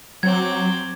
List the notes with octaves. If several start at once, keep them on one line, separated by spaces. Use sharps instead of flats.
F#3 C4 D6 G#6